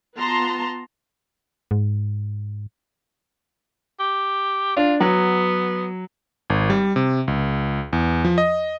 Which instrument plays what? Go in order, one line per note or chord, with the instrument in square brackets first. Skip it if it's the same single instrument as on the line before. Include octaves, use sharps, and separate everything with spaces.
[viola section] B3 F4 A5 A#5 C6
[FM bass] G#2
[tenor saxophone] G4
[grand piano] D4 [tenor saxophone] F4
[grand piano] F#3 [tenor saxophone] B3
[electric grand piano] G#1
G3
C3
C#2
E2
F3
D#5